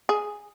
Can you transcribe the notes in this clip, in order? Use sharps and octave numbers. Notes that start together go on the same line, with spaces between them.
G#4